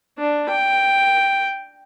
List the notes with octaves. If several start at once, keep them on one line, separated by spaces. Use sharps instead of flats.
D4
G5